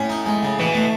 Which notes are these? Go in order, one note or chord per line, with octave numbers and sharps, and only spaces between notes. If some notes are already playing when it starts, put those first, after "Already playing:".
Already playing: A2 C#4
D#4
G#3
C#3
B2 E3
A3